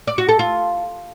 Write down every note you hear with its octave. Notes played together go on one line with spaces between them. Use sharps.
D5
F#4
A4
F4